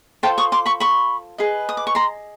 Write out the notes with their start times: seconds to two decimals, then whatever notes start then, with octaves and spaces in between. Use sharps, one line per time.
0.23 F4 A4 C5 G5 A5
0.38 C#6 D#6
0.52 C6 D6
0.66 B5 C#6
0.80 B5 C#6
1.38 G#4 B4 D#5
1.69 D#6
1.77 D6
1.87 C#6
1.95 A#5 C6